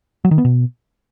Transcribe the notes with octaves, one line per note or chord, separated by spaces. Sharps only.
F#3
D#3
B3
B2